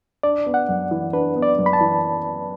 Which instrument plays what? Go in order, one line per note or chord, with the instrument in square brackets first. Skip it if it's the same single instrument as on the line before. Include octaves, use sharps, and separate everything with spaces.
[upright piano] D4 [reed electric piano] D5
[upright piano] B3
[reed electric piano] F#5
[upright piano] F#2
E3
[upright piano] D4 [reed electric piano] B4
[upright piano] B3
[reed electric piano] D5
[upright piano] F#2
[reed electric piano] B5
A5
[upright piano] E3